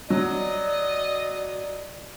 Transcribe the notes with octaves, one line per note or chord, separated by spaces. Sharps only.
F#3 D5 D#5